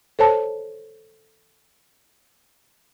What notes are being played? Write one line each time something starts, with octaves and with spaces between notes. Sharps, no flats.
A4 C5 C#5 A5